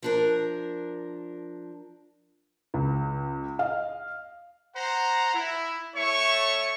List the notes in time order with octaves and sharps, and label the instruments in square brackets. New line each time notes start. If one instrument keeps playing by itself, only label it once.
[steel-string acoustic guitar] F3 D4 A#4
[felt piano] C#2
D#5 F5
[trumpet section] C5 F#5 A#5
E4
A3 C#5 E5 C#6